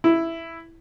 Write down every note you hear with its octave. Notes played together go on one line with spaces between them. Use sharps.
E4